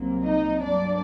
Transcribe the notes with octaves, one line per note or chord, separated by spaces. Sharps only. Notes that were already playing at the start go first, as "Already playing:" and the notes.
Already playing: C2 C3 F#3 A#3
D#4 D#5
G2 F#3 A#3 D4 D5